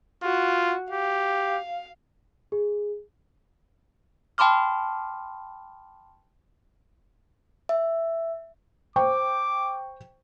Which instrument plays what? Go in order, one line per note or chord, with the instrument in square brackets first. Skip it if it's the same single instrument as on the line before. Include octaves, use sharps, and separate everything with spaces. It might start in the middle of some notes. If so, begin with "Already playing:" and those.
[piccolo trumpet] F4 [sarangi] F#4
[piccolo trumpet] G4 [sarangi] F5
[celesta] G#4
[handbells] G5 A5 B5 C6 D6 F6
[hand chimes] E5
[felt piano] C5 G5 C#6 [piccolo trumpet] D6